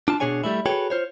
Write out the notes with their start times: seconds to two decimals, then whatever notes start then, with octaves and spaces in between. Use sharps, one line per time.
0.08 D4 F4 A5
0.20 B2 F#3 D4 G#4 C#5 G#5
0.44 G3 A3 E4
0.66 F#4 G#4 A4 B4 C#5 G5
0.90 F4 C5 C#5